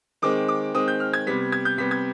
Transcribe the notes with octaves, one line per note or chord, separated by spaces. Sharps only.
D#3 G#3 C4 D6
D6
D#3 G#3 C4 D#6
G6
F6
G#6
C3 G3 B3 B6
G#6
G6
C3 G3 B3 B6
G#6